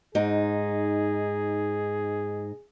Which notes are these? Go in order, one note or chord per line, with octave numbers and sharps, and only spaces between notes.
G#2 D#4 G#4